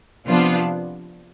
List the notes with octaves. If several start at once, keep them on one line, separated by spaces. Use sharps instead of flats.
C3 F3 B3 D4 F4